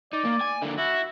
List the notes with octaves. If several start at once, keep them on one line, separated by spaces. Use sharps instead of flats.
D#4 D5
A#3
G#5
D3 A#3
E4 F#4